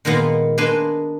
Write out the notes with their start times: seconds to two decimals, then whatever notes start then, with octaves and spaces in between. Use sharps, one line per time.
0.05 A#2 D#3 G#3 A#3 B3
0.58 A#3 D4 B4 D#5 G#5 C6